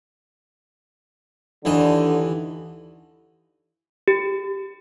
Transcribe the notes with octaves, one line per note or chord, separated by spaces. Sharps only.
D#2 D3 E3 D#5
G4